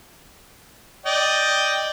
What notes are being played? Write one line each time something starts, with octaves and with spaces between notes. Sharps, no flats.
D5 D#5 G5